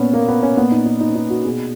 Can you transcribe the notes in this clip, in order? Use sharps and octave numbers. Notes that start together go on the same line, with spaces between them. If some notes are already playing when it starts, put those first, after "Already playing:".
Already playing: A#2 B3 C#4
A#3
B3
C#4
A#2 B3
D#4
D#4
D#4
C#4
D#4
F#4
B2 G#4